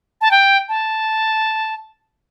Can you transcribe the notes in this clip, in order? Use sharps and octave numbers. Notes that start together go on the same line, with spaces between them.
A5
G5
A5